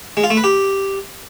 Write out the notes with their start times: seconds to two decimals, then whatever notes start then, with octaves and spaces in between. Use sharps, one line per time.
0.17 G#3
0.24 F4
0.30 A3
0.37 B4
0.44 G4